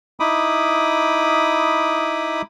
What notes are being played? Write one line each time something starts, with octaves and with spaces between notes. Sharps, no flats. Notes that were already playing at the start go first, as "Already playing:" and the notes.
D#4 E4 B5 D6 D#6